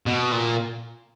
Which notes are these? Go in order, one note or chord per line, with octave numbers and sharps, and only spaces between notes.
B2
A#2